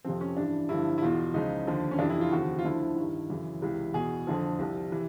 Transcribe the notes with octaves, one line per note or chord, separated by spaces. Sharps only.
F2 C3 F3 C4
C#4
G2 E3 D4
G2 D3 F3 E4
E4
E2 B2 F4
C#2 C#3 F3 D#4
D#2 D3 F3
C#4
F2 C3 E3 D4
E4
F4
D#2 C#3 F3 F#4
F4
D2 D3 F3 E4
G2 D#3
F#2 C#3 E3
C#2 C3 E3
E2 B2 G#4
F2 D3 F3
C2 C3 F3
C3 E3